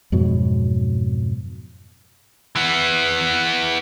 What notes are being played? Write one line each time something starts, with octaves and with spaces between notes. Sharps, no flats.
F2 G#2 B2 F#3
E3 B3